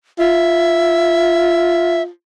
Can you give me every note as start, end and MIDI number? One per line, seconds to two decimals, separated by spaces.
0.19 2.09 65
0.19 2.02 76